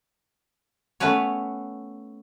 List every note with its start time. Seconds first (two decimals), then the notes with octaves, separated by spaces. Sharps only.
1.00 A3 B3 C#4 B4 C#5